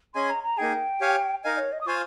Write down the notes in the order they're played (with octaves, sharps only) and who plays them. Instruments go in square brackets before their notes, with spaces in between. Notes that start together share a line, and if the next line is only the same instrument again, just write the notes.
[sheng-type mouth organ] C#4 G#4 D#5 G#5 [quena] C6
[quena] A#5
A#5
[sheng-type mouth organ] A#3 D#4 G#4 [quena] G5
[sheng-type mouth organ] G4 C#5 F5 G#5
[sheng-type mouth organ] D#4 A#4 F5 G#5 [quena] D#5
[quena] C#5
D#5
D#6
[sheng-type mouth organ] F4 C5 F5 G#5 [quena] C#6